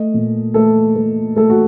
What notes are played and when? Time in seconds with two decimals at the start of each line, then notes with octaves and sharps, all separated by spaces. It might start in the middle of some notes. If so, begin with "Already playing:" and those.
Already playing: A3 D#5
0.14 A#2
0.54 A3 A4
0.96 A3
1.36 A3 A4
1.50 F#4